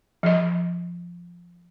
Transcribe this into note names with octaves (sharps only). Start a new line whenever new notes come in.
F3 D#5